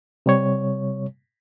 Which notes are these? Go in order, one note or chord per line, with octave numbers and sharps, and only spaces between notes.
C3 G3 C#5